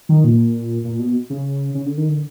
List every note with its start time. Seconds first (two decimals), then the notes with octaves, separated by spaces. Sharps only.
0.09 D#3
0.24 A#2
0.84 A#2
0.99 B2
1.30 C#3
1.74 C#3
1.86 D3
1.97 D#3
2.09 D3